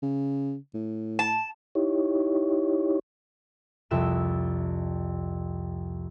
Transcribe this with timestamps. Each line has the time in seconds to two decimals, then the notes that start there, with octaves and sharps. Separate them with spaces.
0.03 C#3
0.74 A2
1.19 A5
1.75 D#4 E4 G4 C#5
3.91 C2 F2 E5 F#6 E7